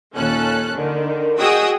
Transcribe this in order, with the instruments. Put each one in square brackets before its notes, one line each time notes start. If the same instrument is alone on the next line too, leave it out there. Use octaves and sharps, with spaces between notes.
[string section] D#2 A#2 C#4 A4 F#6
D3 D#3
F#4 G#4 D#5 G5 D#6 E6